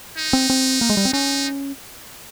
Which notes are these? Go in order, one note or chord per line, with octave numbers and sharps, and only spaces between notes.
D#4
C4
C4
A#3
G#3
G3
C4
C#4 D#4